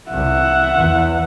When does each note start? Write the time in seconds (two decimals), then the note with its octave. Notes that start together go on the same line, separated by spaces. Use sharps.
0.10 C2 E5 F#5
0.76 E2